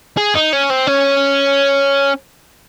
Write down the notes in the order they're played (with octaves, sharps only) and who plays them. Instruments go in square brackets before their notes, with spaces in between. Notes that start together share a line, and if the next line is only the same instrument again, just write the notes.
[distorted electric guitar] G#4
D#4
C#4
C4
C#4